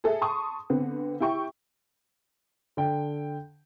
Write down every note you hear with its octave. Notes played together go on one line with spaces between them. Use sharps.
G#4 A4 E5
A5 C6 C#6 D#6
D3 B3 C4
E4 G4 G5 C#6
D3 G5